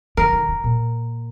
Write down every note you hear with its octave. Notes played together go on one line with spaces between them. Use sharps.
D#3 A#4
D#3
D3
A#2